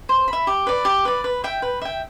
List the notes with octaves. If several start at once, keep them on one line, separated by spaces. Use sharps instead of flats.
C5
B5
E5
G4
B4 D5
G4
B4 D5
B4
E5 G5
B4
E5 G5